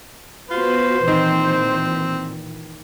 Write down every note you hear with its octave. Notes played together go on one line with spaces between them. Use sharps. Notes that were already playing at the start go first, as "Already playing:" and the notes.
B3 F4 F#4 B4 C5
A#2 D#3 E3 C4